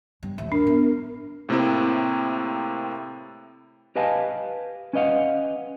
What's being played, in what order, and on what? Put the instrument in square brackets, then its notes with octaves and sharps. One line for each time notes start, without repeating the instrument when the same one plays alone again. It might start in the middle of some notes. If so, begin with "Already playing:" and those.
[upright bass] G2 C#3
[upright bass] A1 D#2 [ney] E5
[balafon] D4 [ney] A#4
[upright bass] B3
[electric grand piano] A2 C3 A#3 C4 E4
[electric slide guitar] G4 B4 D#5 F5 G#5 A5
C#4 B4 D#5 F5 F#5